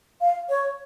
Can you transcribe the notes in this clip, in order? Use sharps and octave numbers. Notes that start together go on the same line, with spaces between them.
F5
C#5